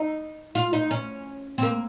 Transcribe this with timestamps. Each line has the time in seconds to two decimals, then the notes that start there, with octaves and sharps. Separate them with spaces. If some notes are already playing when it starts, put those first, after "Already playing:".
Already playing: D#4
0.55 F4
0.73 D#4
0.91 C#4
1.58 C4
1.63 A#3